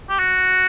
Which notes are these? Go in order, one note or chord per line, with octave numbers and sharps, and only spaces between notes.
G4
F#4